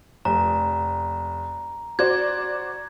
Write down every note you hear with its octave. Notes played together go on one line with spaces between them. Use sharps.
F1 A#5
F#4 C5 D5 G#6